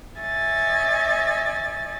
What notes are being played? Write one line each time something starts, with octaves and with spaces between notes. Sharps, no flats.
C#5 D#5 E5 G#5 A6